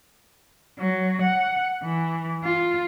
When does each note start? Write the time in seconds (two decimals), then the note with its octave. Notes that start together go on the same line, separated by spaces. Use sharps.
0.79 F#3
1.22 F#5
1.84 E3
2.45 F4